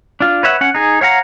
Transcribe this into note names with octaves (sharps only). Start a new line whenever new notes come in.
D4 F4
B4 C#5 E5 F#5
C#4 F#5
D#4 G#4
C#5 F5 F#5 A#5